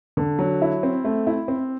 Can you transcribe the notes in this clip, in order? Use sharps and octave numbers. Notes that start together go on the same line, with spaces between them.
D3
F#3
E4
C4
A3
E4
C4